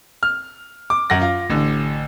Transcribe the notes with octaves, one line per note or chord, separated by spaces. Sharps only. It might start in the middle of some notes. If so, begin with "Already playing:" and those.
F6
D6
F#2 F#5 A#6
F4
A1 D3